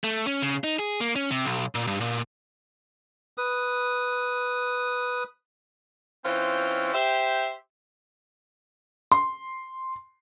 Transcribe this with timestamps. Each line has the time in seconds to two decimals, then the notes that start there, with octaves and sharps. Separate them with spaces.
0.04 A3
0.27 C#4
0.42 C#3
0.64 D#4
0.79 G#4
1.00 A#3
1.16 C#4
1.31 C3
1.45 B1
1.75 A#2
1.87 G2
2.00 A#2
3.38 B4 D#6
6.25 E3 C4 C#4 F4 C5 C#5
6.94 G4 C5 E5
9.12 C6